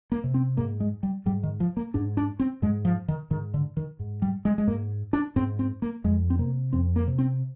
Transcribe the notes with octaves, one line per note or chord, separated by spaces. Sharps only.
A#3
C3
C4
G#2 A#3
G#3
G3
G#2 G3
D#3
F3
A#3
G#2 D4
D4
C4
G#2 G#3
F3
D#3
G#2 D#3
D3
D#3
G#2
G3
G#3
G#3
G#2 A#3
D4
G#2 C4
C4
A#3
F2 G#3
C4
C3 A#3
F2 C4
A#3
C3
C4